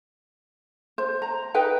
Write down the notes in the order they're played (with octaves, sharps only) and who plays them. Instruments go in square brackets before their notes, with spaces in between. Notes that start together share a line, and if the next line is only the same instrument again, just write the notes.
[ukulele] C5
A#5
D#4 B4 G5